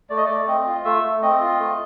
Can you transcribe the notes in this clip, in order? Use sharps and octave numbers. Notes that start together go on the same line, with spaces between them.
A3 D5
D#5
A3 D5
C4 D#5
F4
A3 E5
A3
C4 D#5
F4
A3